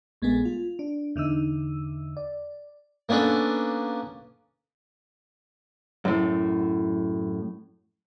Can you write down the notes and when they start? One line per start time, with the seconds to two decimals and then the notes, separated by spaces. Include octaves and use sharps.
0.22 A#1 G#3 A3 B3 G#4
0.45 F4
0.79 D4
1.16 E2 D3 D#4 E6
2.17 D5
3.09 A#3 B3 C#4 D4 A4
6.05 F#2 A2